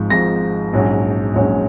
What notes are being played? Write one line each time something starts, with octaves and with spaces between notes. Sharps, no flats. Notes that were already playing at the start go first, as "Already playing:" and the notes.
Already playing: G#1 G#2 F3 G#3
G#1 G#2 F3 G#3 A#6
A#1 G#2 F#3 C#4
A#1 G#2 F#3 C#4